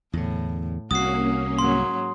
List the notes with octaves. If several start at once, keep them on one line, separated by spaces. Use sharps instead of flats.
E2 A2 D3
C2 A#3 C#4 F#4 D#6 C7
G#2 F#3 C6